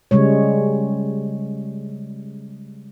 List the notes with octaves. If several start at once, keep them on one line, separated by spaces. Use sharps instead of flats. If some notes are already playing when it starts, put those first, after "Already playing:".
C#3 G3 G#3 C#5